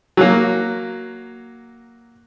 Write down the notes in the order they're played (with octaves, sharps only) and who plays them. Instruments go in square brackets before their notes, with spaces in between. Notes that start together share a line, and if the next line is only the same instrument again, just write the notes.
[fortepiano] F#3 A#3